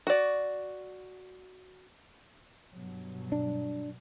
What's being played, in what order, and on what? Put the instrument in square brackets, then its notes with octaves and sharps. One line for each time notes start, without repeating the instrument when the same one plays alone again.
[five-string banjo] F#4 D5
[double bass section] G2 B2 F#3
[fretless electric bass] D4